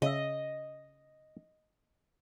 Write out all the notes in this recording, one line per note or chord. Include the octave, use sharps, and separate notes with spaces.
C#3 D#5 E5